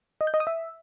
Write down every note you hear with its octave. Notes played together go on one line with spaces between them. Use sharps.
D#5
G6
D#5
D#6
E5